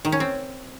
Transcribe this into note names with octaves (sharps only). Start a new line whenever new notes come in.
D#3
C#4
C4